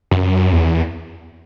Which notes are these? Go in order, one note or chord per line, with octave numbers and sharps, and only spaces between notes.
F#2
E2